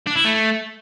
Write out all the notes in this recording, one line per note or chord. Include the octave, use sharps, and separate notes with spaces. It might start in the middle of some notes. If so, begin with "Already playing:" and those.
D4
E4
A3